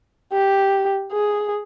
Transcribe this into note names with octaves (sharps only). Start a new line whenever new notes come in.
G4
G#4